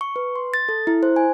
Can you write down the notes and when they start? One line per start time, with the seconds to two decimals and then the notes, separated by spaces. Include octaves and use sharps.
0.01 C#6
0.16 B4
0.36 C6
0.54 A6
0.69 A4
0.87 E4
1.03 C5
1.16 G#5